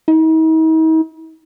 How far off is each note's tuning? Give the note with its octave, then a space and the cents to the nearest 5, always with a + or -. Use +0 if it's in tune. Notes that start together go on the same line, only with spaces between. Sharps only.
D#4 +45